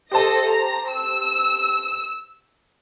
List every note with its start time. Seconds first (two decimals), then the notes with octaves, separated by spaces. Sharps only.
0.11 G4 A4 C5 D#5 A5 A#6
0.49 A#5
0.92 E6